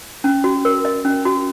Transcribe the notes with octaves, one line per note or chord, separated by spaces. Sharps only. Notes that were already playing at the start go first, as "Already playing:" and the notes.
C#4
F#4
A#4
D#5
C#4
F#4